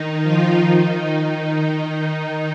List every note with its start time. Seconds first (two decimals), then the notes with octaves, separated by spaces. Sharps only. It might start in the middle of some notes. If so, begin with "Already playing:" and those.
Already playing: D#3 D#4
0.23 F3 F4
0.59 D#3 D#4